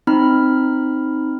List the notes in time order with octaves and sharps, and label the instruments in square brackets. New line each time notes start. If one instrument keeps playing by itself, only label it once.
[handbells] C4 D#4 B5 F6